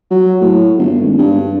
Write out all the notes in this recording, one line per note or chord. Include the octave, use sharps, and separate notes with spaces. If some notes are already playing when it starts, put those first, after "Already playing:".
F#3
A2
G1
G#1
G2